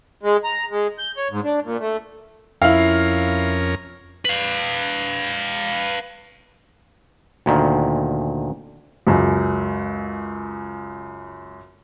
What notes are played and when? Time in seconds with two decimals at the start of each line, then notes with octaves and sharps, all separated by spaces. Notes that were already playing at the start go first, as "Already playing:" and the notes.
0.23 G#3
0.44 A#5
0.71 G#3
0.98 G6
1.17 C#5
1.31 G#2
1.44 D4
1.65 A#2
1.80 A3
2.62 F2 C#4 E4 A#4 F5
4.25 B4 F5
7.46 D2 A#2 D#3
9.07 C#2 F#2